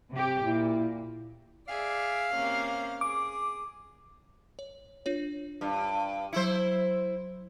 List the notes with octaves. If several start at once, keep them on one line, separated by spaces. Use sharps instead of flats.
C3 G4
A#2 E4
G#4 D5 E5 F5
C3 A#3 C#4
G#4 D6
C#5
D4 F4 C#5
G2
F#3 E4 C5 E6 C#7